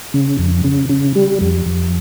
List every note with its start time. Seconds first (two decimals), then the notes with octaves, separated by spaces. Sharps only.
0.14 C#3
0.39 F2
0.64 C#3
0.89 C#3
1.15 G3
1.41 F2
1.66 F2